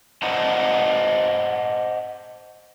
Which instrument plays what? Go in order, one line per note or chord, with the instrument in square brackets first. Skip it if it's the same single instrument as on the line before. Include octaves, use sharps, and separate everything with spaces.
[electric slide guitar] C5 D5 D#5 F#5 A5 A#5